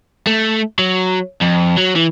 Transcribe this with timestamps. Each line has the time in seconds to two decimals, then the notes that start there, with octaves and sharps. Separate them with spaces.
0.27 A3
0.79 F#3
1.41 F2
1.77 F#3
1.96 E3